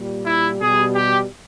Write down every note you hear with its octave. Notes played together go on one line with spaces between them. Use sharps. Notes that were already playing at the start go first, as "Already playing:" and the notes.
Already playing: A#2 G3
E4
B2 G3 G#4
G4